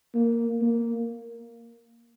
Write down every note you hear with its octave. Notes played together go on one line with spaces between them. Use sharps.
A#3
A#3